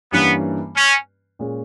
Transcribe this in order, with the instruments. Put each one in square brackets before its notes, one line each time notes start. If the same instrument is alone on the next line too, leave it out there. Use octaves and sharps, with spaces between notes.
[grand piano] G2 E3 G3 A#3 C#4 [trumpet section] B3
[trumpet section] C#4
[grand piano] A#2 G#3 C#4